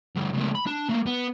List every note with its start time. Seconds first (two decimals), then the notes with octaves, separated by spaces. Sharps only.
0.16 D2 G2
0.33 C#2 A2
0.55 B5
0.67 D4
0.89 A3 A#3
1.06 B3